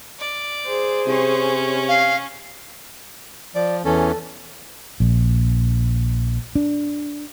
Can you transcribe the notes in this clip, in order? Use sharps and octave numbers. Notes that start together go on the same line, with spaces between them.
D5
G#4 C5
C3 C#4 C#5
F5
F3 D5
E2 E3 C#4 A4
A#1
D4